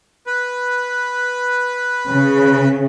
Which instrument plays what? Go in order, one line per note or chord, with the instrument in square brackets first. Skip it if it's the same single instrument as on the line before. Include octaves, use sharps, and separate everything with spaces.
[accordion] B4
[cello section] C#3